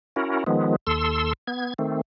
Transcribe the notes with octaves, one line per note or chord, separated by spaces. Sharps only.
C#4 E4 F#4 A#4
D#3 F3 G#3 B3
D#2 A4 C6 E6
B3 G#6
D#3 A3 C4